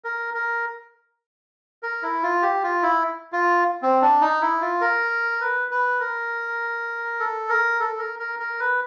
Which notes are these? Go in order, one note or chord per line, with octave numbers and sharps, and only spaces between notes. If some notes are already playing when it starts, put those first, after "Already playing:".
A#4
A#4
A#4
E4
F4
G4
F4
E4
F4
C4
D4
D#4
E4
F4
A#4
B4
B4
A#4
A4
A#4
A4
A#4
A#4
A#4
B4